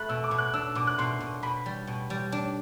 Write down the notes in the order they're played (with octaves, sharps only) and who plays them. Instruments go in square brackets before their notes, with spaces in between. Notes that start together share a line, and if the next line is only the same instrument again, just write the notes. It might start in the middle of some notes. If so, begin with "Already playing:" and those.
Already playing: [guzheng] A3 [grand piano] B5 F#6
[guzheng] B2 [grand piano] E6
[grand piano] D6
[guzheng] B2
[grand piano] F#6
[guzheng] D4 [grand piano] E6
[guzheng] B2 [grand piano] D6
[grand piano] F#6
[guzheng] B2 [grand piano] C6
[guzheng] B2
[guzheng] B2 [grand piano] B5
[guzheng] G3
B2
G3
D4